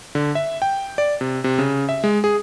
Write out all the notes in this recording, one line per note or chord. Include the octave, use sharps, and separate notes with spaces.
D3
E5
G5
D5
C3
C3
C#3
E5
G#3
G#4